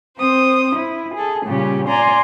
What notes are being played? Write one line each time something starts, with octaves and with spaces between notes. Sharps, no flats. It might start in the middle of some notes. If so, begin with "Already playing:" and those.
C4 C5 D#6
E4
G#4 A4
A#2 C#3 G3 C#4 G4
D5 G#5 A#5 C6